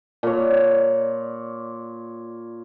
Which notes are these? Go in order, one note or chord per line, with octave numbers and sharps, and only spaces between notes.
A#2 C#5